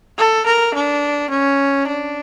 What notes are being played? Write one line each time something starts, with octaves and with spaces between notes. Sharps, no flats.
A4
A#4
D4
C#4
D4